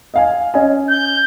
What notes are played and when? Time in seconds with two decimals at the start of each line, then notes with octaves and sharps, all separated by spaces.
0.14 D#5 F5 G#5
0.54 C#4 D#5 G#5
0.91 G6